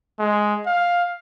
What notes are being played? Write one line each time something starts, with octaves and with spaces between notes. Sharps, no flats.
G#3
F5